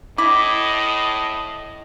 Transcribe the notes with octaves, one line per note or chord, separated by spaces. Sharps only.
A2 E4 D#5 D6